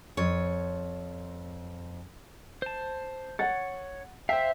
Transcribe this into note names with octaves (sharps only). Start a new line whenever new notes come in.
F2 C#5
C5 A5
C#5 F#5 A6
C5 E5 F5 G5